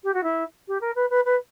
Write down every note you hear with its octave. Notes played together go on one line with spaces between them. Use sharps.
G4
F#4
E4
G4
A#4
B4
B4
B4